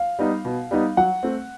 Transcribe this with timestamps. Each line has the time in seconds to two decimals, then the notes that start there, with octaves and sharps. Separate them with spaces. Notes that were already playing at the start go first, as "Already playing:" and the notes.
Already playing: F5
0.19 G3 B3 D#4
0.45 B2
0.71 G3 B3 D#4
0.97 F#3 F#5
1.23 A3 C4